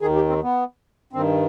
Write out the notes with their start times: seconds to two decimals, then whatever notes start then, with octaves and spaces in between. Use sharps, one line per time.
0.01 D#2 D#3 G#4
0.15 G4
0.29 C4
0.43 B3
1.13 G2 D#3 C4